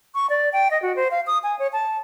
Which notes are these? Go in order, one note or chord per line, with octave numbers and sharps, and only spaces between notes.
C#6
D5
G5
D#5
F#4
C5
F5
D#6
G#5
C#5
A5